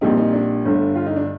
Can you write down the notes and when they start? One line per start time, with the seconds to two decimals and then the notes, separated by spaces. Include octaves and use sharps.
0.01 A#1 A#2 G3 C4 D#4
0.17 D#4
0.33 D4
0.65 G1 G2 D3 A3
0.95 F4
1.06 D#4
1.16 D4